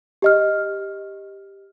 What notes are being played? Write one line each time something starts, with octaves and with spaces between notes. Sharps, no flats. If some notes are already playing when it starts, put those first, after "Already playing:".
G4 D#5 F6